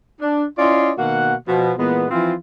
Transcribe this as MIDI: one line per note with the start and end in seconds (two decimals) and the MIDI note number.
0.21 0.45 62
0.58 0.91 61
0.58 0.91 64
0.58 0.91 65
0.58 0.91 74
0.58 0.91 75
0.58 0.91 84
0.98 1.34 47
0.98 1.34 51
0.98 1.34 58
0.98 1.34 66
0.98 1.34 78
1.48 1.72 47
1.48 1.72 53
1.78 2.06 46
1.78 2.06 52
1.78 2.06 56
1.78 2.06 59
2.11 2.33 52
2.11 2.33 53
2.11 2.33 60
2.11 2.33 65